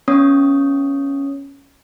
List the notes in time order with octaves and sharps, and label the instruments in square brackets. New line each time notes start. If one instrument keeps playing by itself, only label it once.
[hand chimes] B3 C#4 C#5 D#6